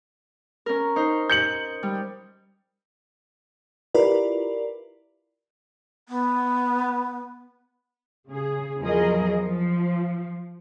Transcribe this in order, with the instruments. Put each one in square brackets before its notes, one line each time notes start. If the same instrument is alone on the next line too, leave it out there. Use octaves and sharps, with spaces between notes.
[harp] C#4 A#4
D#4 C5
[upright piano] G6 C#7 F#7
[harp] G3
[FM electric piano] E4 F4 G4 A#4 B4 D5
[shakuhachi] B3
[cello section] C#3 G#4
E2 F3 F#3 G#4 A#4 D#5
F3